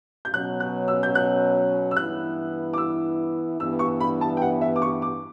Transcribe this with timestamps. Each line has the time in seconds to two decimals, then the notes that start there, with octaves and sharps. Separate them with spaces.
0.25 G6
0.33 B2 F#3 C#4 F#6
0.60 F#6
0.88 E6
1.03 G6
1.15 F#6
1.91 E6
1.97 G2 E3 B3 E4 F#6
2.74 D6
2.78 E6
3.59 G2 E3 B3 E6
3.79 C#6
4.00 B5
4.21 A5
4.37 G5
4.42 F#5
4.61 E5
4.76 D6
4.82 C#6
5.02 D6